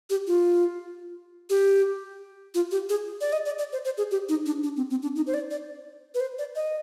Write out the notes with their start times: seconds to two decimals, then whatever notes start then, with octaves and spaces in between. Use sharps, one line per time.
0.10 G4
0.27 F4
1.50 G4
2.55 F4
2.71 G4
2.89 G#4
3.21 D5
3.32 D#5
3.45 D5
3.59 D5
3.72 C5
3.85 C5
3.98 G#4
4.11 G4
4.29 D#4
4.46 D4
4.63 D4
4.77 C4
4.90 C4
5.02 D4
5.16 D#4
5.27 C5
5.34 D5
5.51 D5
6.14 B4
6.20 C5
6.38 D5
6.56 D#5